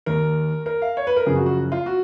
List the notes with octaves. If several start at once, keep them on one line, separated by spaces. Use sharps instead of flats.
D#2 D#3 A#4
A#4
F5
C#5
B4
A#4
F#2 C#3 F3 G#4
F#4
F#4
F4
F#4